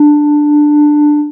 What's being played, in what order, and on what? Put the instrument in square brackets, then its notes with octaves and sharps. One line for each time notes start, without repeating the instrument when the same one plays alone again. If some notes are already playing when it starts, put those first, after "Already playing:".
Already playing: [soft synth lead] D4